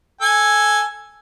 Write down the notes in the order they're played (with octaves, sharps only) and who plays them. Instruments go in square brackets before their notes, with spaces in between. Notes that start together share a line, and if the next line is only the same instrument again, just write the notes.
[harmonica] A4 G#5